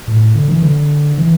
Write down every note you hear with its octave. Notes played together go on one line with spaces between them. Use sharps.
A2
D3
E3
D3
E3